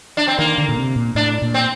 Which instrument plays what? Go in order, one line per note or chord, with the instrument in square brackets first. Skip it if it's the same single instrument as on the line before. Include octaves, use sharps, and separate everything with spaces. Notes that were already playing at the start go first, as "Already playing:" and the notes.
[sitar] D4
C4
[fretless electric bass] D#3 [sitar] A#3
[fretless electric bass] D3
A#2
C3
A#2
[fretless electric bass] A2 [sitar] D4
[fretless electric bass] A#2
[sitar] C4